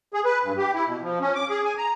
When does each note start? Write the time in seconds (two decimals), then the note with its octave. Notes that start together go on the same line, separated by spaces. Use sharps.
0.14 G#4
0.25 B4
0.44 G2
0.57 G4
0.74 E4
0.86 B2
1.02 F3
1.21 C#4
1.35 D6
1.49 G#4
1.65 G#5
1.78 A#5